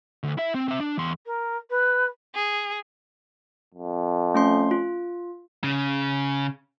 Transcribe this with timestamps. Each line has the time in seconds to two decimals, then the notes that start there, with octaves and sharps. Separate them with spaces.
0.23 D2
0.37 E4 E5
0.54 C4
0.68 C4 E5
0.80 D4
0.98 E2 C6
1.26 A#4
1.70 B4
2.35 G#4
3.74 F2
4.35 A3 C#4 C6
4.71 F4
5.64 C#3